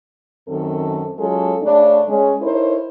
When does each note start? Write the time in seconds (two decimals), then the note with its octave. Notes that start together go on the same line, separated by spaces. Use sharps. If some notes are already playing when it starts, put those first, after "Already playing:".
0.48 F#2 D#3 C4 A4
1.19 F#3 G#3 C#4 F4 A4
1.62 C#3 A3 C#4 D4
2.08 G#3 C#4
2.41 D#4 E4 A4 A#4 C5 C#5